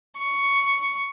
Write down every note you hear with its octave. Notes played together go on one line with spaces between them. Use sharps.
C#6